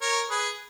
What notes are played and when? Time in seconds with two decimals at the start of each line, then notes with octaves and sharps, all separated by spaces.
0.01 A#4 C#5
0.29 G#4 B4